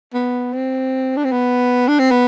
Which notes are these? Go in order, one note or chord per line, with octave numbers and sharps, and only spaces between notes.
B3
C4
D4
C4
B3
D4
C4
B3